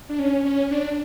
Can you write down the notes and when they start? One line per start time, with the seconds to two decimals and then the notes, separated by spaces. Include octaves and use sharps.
0.09 D4
0.19 C#4
0.45 C#4
0.71 D4